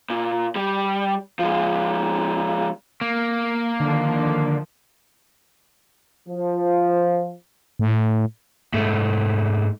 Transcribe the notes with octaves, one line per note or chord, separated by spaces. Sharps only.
A#2
G3
F3 G#3
A#3
D3 D#3 F3
F3
A2
G#2 A3